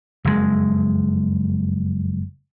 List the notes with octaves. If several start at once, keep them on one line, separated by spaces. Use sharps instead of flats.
F#1 F2 G#2 G#3